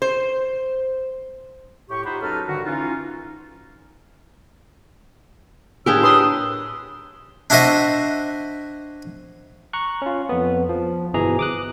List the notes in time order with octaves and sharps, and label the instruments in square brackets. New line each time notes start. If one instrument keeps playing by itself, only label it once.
[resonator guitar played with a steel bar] C5
[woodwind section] A2 G4 C#6
D#4 F4 G4 C5 F#5 B5
F#2 D#4 A4 B4 A5 F6
G2 D3 D#3 F#4
E3 C#4 D#4 F4
[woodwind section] A2 C#5 E6 [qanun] D4 G4 A#4 [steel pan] F4 G#4
[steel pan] B4 C6 [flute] D#6
[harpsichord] D4 E4 F#4 C5 D#5 E5
[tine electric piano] A#5 C#6 F#6
C#4 F4
F2 B3
F3
G1 B2 E3 G#4 A#5
D6 D#6 F#6